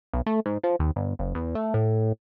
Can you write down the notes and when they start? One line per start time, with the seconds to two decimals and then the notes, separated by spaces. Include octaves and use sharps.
0.13 B1
0.26 A3
0.46 G#2
0.64 F3
0.79 D#2
0.96 G1
1.19 F#1
1.35 E2
1.55 A3
1.74 A2